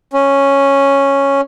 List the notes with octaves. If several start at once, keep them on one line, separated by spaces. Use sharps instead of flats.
C#4